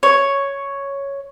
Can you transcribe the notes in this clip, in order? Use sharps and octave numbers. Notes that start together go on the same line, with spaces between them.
C#5